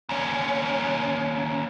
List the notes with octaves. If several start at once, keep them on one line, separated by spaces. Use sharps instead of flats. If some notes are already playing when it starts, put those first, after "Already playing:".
D#2 C#4